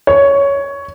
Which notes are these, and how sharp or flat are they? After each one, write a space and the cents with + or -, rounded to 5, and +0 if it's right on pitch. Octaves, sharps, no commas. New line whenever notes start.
C#5 +10